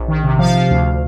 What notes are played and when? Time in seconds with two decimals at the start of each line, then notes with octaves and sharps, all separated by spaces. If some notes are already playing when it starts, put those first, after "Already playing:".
Already playing: A#1
0.08 D#3
0.24 C3
0.39 F3 F5
0.55 F3
0.71 D2